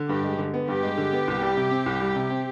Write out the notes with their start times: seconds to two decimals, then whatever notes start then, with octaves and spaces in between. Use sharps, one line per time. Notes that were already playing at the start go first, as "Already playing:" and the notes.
Already playing: D3
0.09 G2 G4
0.24 G#3
0.38 D3
0.54 B3
0.68 G2 G4
0.83 G#3
0.98 D3
1.13 B3
1.28 C2
1.42 G3
1.57 C3
1.71 C4
1.86 C2
2.01 G3
2.16 C3
2.30 C4